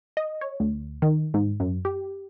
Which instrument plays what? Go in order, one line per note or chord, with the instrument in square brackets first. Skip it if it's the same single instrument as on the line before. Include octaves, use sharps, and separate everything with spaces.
[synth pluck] D#5
C#5
D2
D#3
G#2
F#2
G4